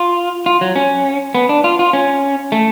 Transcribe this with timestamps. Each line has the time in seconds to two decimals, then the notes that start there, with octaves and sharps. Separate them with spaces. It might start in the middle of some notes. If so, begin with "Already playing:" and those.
Already playing: F4
0.46 F4
0.61 F#3
0.76 C#4
1.35 B3
1.49 D4
1.64 F4
1.79 F4
1.93 C#4
2.52 A3